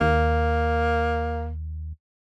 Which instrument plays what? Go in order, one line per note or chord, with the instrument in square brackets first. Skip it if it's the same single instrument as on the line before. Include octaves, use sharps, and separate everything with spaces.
[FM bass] D#2 [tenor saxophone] A#3